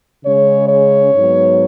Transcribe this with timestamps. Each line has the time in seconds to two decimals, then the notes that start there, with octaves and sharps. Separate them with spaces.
0.24 C#3 G#3 C#4 C#5
0.69 C#5
1.14 G#2 F#3 B3